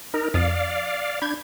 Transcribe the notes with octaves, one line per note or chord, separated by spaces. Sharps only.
D#4 A#4
F2 D5 F5 D#6 A6
D4 B5 G6 G#6